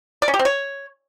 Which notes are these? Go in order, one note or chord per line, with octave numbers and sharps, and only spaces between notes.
D5
C#4
G4
C4
C#5